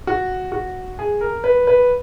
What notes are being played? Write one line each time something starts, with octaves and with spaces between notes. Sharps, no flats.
F#4
F#4
G#4
A#4
B4
B4